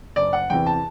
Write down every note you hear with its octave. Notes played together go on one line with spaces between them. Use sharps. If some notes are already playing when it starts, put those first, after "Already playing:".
F#1 D5
F#5
E2 C3 E3 G5
A5